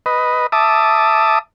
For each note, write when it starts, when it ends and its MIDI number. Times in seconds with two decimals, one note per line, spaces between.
0.06 0.47 71
0.06 0.47 75
0.52 1.39 76
0.52 1.39 81
0.52 1.39 86
0.52 1.39 87